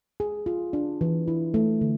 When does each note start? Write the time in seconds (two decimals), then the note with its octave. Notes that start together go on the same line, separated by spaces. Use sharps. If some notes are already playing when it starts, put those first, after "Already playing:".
0.20 G#4
0.46 F4
0.73 D4
1.01 E3
1.28 E4
1.54 A3
1.81 D3